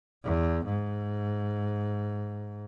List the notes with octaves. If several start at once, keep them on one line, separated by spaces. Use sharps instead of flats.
E2
G#2